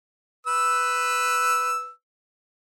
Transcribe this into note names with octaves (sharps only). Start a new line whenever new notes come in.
B4 E6